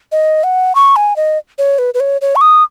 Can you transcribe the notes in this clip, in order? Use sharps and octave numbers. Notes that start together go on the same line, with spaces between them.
D#5
F#5
C#6
G#5
D#5
C#5
B4
B4
C#5
C#5
C#6
D#6